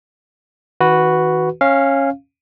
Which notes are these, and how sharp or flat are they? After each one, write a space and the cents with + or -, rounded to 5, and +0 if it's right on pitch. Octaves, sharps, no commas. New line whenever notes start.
D#3 +45 F#4 +0 B4 +0
C#4 -15 F5 -5